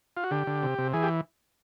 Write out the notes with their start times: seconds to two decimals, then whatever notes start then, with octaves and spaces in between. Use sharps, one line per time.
0.17 F4
0.24 F#4
0.31 D3 G4
0.47 D3
0.63 C3
0.78 C3
0.93 E3 G#4
1.03 G4